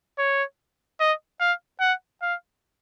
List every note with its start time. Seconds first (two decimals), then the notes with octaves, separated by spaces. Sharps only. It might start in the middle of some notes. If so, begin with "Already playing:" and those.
0.19 C#5
1.00 D#5
1.40 F5
1.80 F#5
2.22 F5